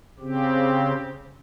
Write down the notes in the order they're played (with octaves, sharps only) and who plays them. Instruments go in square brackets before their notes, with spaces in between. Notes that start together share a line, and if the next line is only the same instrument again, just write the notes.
[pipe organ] C#3 C4 G4